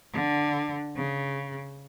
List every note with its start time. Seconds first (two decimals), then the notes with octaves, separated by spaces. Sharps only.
0.13 D3
0.96 C#3